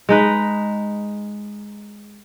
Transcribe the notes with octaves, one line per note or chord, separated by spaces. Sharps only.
G#3 D#4 B4